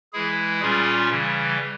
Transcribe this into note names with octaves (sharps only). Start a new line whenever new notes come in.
E3 G#3 E4 G#4
A#2 G3 C#4 F4 G#4
C#3 E3 G3